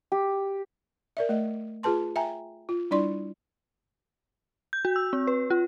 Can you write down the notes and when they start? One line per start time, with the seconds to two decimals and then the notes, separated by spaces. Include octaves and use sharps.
0.12 G4
1.17 A#4 D5 E5
1.29 A3 D#5
1.83 F4 G#4 B4 A5 C6
2.16 E5 G5 G#5 A#5
2.69 F4
2.91 G3 D4 E4 D5 C6
4.73 G6
4.85 F#4
4.96 E6
5.13 C4
5.27 B4
5.50 F4